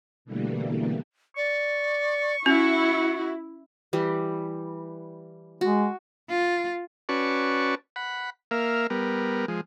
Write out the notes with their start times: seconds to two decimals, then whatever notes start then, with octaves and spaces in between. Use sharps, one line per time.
0.25 B2 D3 E3 G3 A3 A#3
1.37 D5 C#6
2.46 C#4 E4 F#4
3.93 E3 G3
5.61 G#3 F#4
6.30 F4
7.09 C#4 F#4 B4 D5 A5 C#6
7.96 F#5 B5
8.51 A#3 A#4 E5 F5
8.90 G3 B3 A#4
9.48 F3 G#3